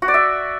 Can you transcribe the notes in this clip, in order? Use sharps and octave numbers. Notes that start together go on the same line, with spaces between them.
F#4
D5
E5